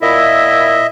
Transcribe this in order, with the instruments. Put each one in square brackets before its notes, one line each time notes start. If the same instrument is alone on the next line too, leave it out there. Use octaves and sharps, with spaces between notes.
[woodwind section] A#2 E4 [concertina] D#5 E5